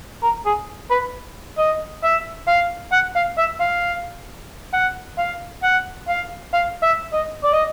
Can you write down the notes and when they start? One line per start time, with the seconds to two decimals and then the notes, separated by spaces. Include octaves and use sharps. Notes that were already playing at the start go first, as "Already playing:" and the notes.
0.22 A#4
0.45 G#4
0.90 B4
1.58 D#5
2.03 E5
2.47 F5
2.92 F#5
3.15 F5
3.38 E5
3.60 F5
4.73 F#5
5.18 F5
5.63 F#5
6.08 F5
6.53 F5
6.82 E5
7.13 D#5
7.43 D5
7.53 D#5